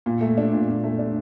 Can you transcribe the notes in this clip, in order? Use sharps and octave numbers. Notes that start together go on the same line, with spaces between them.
A#2
A3
D4
A#2
A#2
A3
D4